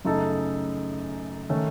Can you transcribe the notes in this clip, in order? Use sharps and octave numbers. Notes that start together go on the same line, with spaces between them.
F#2 C#3 A3 D#4 A4
D#3 A3 C#4